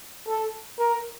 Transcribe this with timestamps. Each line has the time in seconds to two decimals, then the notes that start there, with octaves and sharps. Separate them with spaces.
0.28 A4
0.79 A#4